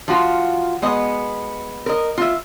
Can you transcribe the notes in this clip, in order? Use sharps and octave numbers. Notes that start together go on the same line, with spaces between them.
F3 F4 F#4
G#3 B3 D#5
A#4 D#5
F4 E5